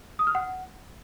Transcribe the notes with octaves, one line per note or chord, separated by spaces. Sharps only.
D#6
F6
F#5